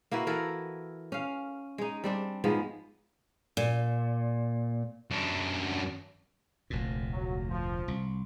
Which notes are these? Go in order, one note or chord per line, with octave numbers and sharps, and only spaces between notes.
A#3 E4 F#4 B4
E3 E4 A4 A#4
C#4 F5
G#3 D#4
G3 C4 D4
G#2 F3 G#3 B3
A#2
F#2 D4
F1 D2 A#2
F#3
F3
C2